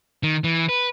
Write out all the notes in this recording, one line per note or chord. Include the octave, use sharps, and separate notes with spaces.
D#3
E3
B4